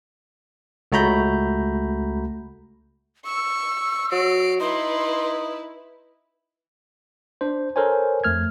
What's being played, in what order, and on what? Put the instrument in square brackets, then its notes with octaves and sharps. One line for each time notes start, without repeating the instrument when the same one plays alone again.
[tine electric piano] C#2 A3 F#4 A#5 B5 G6
[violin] C#6 [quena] E6
[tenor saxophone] F#3 [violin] C7 D7
[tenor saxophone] D#4 [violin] E4 B4 [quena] C6
[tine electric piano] D4 C5
A4 A#4 C5 C#5 G#5
F2 A3 F6 G#6